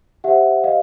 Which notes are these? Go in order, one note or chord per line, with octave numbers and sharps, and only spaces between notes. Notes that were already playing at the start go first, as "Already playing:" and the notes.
G4 C5 E5 F#5
D#5 F5